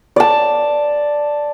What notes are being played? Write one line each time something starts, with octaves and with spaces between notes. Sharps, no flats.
D5 A5